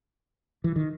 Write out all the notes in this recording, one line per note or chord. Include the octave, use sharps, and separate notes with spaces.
E3
D#3